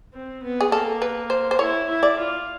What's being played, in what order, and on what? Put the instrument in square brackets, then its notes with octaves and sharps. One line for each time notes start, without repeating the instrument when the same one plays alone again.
[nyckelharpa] C4
B3
[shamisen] G#4
[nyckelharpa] A#3 [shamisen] A4
[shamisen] B4
C5
C5
[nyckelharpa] E4 [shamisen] C#5
[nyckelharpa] E4
[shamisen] D5
[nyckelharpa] F4